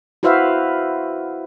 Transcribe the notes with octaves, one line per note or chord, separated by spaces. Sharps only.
E4 F#4 B4 C5 E5 F5